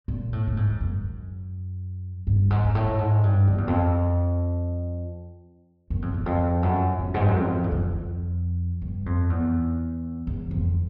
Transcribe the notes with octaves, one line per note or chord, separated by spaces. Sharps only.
A#2
A2
A2
G#2
F#2
G2
G#2
G#2
A2
G#2
G2
F2
E2
F2
F#2
F2
E2
F2
F#2
F2
G#2
G2
F#2
F2
E2
F2
G2
F2
E2
E2
F2